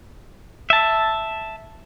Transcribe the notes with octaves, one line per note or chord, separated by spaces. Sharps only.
E5 A5